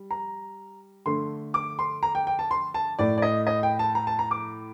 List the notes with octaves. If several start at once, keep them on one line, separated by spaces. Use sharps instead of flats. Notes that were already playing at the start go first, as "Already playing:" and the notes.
Already playing: G3
A#5
D3 A3 C6
D6
C6
A#5
G5
G5
A5
C6
A5
A2 A3 D5
D5
D#5
D#5
G5
A5
A#5
A5
A#5
D6